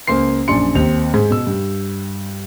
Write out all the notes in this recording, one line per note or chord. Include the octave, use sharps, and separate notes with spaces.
C#2 A#3 C5 C6 C7
A#1 F#2 D4 C6 C#7
D#2 C4 F7
G#2
B2 E6
G2